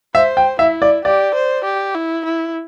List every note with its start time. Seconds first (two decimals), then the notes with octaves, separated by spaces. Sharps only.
0.15 C5 E5
0.37 G5
0.59 E4 E5
0.82 D5
1.05 G4 D5
1.35 C5
1.64 G4
1.95 E4
2.25 E4